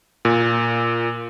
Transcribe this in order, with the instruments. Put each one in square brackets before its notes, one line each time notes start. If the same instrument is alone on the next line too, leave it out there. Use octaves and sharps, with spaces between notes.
[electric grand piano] A#2